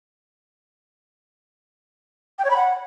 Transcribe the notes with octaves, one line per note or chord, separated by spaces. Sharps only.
G5
C#5
B5
F#5